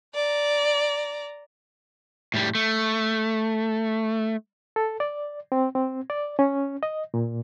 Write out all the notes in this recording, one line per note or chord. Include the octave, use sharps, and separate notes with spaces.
D5 A#5
A2 G3
A3
A4
D5
C4
C4
D5
C#4
D#5
A#2